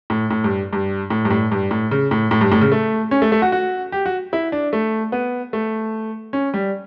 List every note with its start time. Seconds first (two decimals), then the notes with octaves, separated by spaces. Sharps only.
0.10 A2
0.30 A2
0.44 G2
0.73 G2
1.10 A2
1.25 G2
1.31 A2
1.51 G2
1.71 A2
1.91 C#3
2.11 A2
2.31 A2
2.41 G2
2.52 A2
2.61 C#3
2.72 A3
3.11 C#4
3.22 A3
3.32 A3
3.42 F#4
3.52 F#4
3.92 G4
4.06 F#4
4.33 E4
4.52 D4
4.73 A3
5.12 B3
5.53 A3
6.33 C#4
6.54 G3